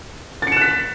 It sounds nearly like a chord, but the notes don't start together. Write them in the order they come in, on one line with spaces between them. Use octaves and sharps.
A6 C#7 E7 F#6 B6